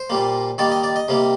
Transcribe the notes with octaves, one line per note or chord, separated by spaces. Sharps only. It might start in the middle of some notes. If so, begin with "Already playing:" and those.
Already playing: C5
A#2 G3 A#3
D#3 G3 A#3 D5
D#5
D5
D#5
C3 G3 A#3